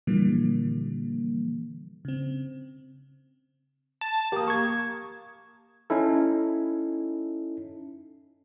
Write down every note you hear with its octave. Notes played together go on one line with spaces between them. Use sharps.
A#2 D3 E3 F3 G3 A#3
C#3 C4
A5
A#3 G4 D#6
C#6 G#6
C#4 D#4 E4 A4